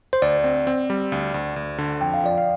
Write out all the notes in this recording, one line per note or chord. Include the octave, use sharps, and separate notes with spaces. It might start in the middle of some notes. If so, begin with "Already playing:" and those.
C5
D2 D5
C4
C4
G3
D2
D2
D2
D3
F2 G5
F5
F3 D5
F5